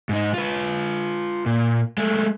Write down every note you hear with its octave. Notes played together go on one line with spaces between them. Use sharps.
G#2 D#4
F4 B4
A#2
G#3 A3